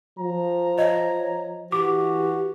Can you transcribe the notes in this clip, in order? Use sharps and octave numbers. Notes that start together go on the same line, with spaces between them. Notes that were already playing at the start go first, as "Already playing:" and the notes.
F3 A#5
C#5 D#5
E3 F#4 G4 D6